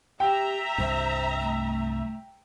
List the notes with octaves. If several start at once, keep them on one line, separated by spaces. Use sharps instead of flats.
G4 E5 G5 A#5
C2 G2 C5
A3